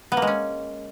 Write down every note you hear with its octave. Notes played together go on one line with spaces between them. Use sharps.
B3
A#3
G#3
C#4